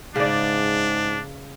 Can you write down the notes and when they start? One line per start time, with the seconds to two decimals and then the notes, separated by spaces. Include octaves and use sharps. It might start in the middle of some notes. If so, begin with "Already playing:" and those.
0.16 G#2 C#3 D4 D5